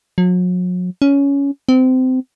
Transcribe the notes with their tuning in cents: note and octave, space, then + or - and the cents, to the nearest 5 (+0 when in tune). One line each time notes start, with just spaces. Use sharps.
F#3 -40
C#4 +15
C4 -25